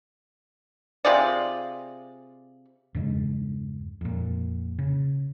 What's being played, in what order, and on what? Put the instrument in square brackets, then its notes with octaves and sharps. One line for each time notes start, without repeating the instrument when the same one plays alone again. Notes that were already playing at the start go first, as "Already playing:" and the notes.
[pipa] C3 F4 G#4 D5
[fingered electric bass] E2 G2 C#3 G#3
F2 A#2
C#3